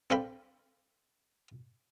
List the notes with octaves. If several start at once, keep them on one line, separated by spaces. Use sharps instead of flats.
C4 D4 A4 F5 G5 B5